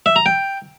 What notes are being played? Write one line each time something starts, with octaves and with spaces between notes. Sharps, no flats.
E5
A#5
G5